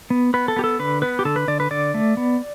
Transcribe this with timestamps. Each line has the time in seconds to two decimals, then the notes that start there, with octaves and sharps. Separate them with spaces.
0.10 B3
0.34 B3 B4
0.48 A4
0.56 B3 G4
0.64 A4
0.79 D3 B4
1.02 B3 B4
1.19 G4
1.25 D3 A4
1.36 B4
1.48 D3 D5
1.60 B4
1.71 D3 D5
1.94 A3
2.17 B3